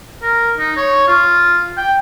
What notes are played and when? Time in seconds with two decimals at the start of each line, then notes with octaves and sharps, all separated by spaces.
0.22 A#4
0.58 D#4
0.77 C#5
1.08 F4
1.77 G5